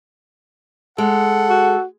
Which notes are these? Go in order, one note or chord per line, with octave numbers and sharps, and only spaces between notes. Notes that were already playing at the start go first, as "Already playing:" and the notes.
G#3 A4 F#5
F#4